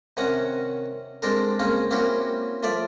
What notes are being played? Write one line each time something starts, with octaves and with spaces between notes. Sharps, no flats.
C3 D#3 C#4 F#5 A#5
G#3 C4 D4 A4 A#4
C#3 A#3 C4 C#4
A#3 C4 C#4 E4 F#4 G4
F3 A3 A4 D5 E5